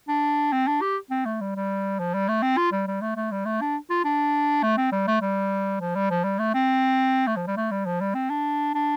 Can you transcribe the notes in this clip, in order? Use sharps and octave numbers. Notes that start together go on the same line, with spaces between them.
D4
C4
D4
G4
C4
A3
G3
G3
F3
G3
A3
C4
F4
G3
G3
A3
A3
G3
A3
D4
F4
D4
A3
C4
G3
A3
G3
F3
G3
F3
G3
A3
C4
A3
F3
G3
A3
G3
F3
G3
C4
D4
D4